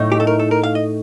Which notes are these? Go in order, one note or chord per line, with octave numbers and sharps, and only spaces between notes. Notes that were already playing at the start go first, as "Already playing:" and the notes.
Already playing: A2 A3 D#4
G4
A4
A#4
A4
A#4
F5
D#5